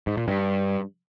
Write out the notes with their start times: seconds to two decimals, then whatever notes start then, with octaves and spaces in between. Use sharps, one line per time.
0.07 G#2
0.17 A#2
0.28 G2